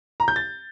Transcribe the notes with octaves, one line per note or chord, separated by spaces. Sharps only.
A#5
G6
A6